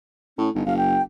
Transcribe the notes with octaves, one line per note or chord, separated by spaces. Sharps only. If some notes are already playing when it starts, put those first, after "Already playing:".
A2 C#4
G1 D#4
F#1 F5
G5